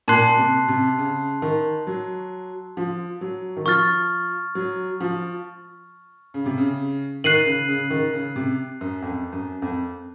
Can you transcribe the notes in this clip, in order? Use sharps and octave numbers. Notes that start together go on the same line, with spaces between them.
A#2 A5 C6 F#6 C7
C3
C3
C#3
D#3
F#3
F3
F#3
D#3
F3 C#6 F6 A6
F#3
F3
C#3
C3
C#3
D#3 F#6 C7 D#7 F#7
C#3
C#3
D#3
C#3
C3
F#2
F2
F#2
F2